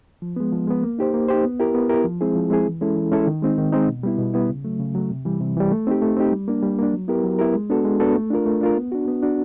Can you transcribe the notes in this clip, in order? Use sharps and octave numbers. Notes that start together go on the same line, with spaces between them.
F3
G#3 B3
F3
G#3 B3
A#3
D#4 G4 C5
A#3
D#4 G4 C5
B3
E4 G4 A#4
B3
E4 G4 A#4
F3
G#3 C4 E4 G#4
F3
G#3 C4 E4 G#4
E3
G#3 C#4 E4 A4
E3
G#3 C#4 E4 A4
D#3
G#3 C4 D#4
D#3
G#3 C4 D#4
B2
G3 B3 E4
B2
G3 B3 E4
C#3
F#3 A3
C#3
F#3 A3
C3
E3 G3
C3
E3 G3
A3
C4 D#4 G4
A3
C4 D#4 G4
G3
A#3 D4
G3
A#3 D4
F#3
B3 E4 G4 A#4
F#3
B3 E4 G4 A#4
G#3
B3 D4 F#4 A4
G#3
B3 D4 F#4 A4
A3
D4 F4 A#4
A3
D4 F4 A#4
B3
D4 F#4
B3
D4 F#4